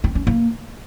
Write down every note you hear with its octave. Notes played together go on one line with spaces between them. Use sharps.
C4
C#4
A#3